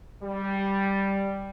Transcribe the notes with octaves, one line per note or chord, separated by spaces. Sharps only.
G3